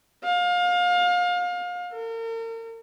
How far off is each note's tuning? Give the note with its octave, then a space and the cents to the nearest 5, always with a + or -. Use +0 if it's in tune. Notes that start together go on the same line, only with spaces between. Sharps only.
F5 +30
A#4 -40